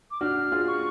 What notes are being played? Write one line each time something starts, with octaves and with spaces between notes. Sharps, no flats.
D6
D4 F#4 F6
F4 G#4
C#6